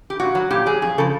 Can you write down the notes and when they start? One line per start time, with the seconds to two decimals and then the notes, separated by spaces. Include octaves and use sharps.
0.10 G4
0.20 A#2 F#4
0.35 F#3
0.51 A#2 G4
0.66 F#3 G#4
0.82 F2 G#4
0.98 C#3 F3 A4